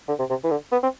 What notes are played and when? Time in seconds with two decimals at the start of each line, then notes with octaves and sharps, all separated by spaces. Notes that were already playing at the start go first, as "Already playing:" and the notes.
0.08 D3
0.19 C3
0.30 C3
0.44 E3
0.51 D3
0.72 B3
0.83 C4